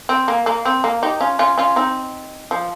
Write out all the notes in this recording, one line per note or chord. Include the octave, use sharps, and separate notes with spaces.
C4
A#3
A#3
C4
A#3
D#4 G4
C#4 F4
C#4 F4
C#4 F4
C4 D#4
F3